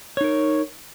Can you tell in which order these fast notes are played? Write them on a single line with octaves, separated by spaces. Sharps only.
C#5 D#4 A#4